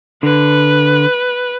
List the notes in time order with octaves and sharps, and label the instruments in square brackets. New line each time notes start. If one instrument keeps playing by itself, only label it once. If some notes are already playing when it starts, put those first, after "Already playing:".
[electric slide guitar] D3 [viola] B4